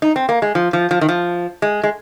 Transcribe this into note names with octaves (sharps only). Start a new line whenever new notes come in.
D#4
C4
A#3
G#3
F3
F3
F3
D#3
F3
G#3
G#3